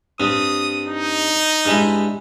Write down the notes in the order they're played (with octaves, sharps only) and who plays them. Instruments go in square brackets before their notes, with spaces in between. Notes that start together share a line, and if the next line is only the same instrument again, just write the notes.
[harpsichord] G2 C4 [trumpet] D#6
[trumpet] D#4
[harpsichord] G2 G#3 E4